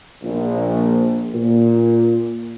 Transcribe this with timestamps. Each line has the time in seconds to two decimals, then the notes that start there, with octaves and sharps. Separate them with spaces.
0.23 A#1
1.35 A#2